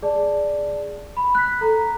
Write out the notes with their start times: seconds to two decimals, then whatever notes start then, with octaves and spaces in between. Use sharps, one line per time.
0.02 G#4 D5 A5
1.17 B5
1.35 F#6 B6
1.61 A4 A#5